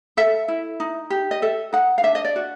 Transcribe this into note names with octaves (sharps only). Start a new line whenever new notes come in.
A4 E5
E4
D#4
G4
D#5
A4 E5
D#4 F#5
F5
D4 E5
D#5
D5
F#4